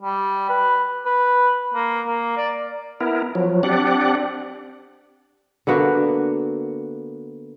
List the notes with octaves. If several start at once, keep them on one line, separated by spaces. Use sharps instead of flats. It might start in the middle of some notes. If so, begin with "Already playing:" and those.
G3
B4
B4
A#3
A#3
D5
B3 E4 A#4
F3 F#3
C4 D4 G4 D5 F#5
D3 A#3 B3 F#4